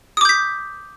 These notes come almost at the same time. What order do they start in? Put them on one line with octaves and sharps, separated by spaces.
D#6 D6 G6 B6